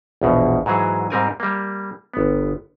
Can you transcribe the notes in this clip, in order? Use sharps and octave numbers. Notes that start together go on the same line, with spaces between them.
A#1 E2 B2
G#2 E3 F#3 G#4
G#2 G3 C4 A#4 D5 G#5
G3 A#3
G1 B3